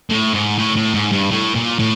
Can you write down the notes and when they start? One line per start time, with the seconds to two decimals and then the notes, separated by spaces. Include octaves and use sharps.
0.10 A2
0.34 G#2
0.58 A2
0.76 A2
0.94 G#2
1.12 G2
1.31 A2
1.55 A#2
1.79 A2